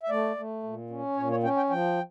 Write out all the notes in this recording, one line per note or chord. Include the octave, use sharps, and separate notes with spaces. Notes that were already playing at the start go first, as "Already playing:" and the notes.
E5
A3 D5
A3
A#2
C#4
A#2 C#5
C#5
C#4 G5
G5
F3 G5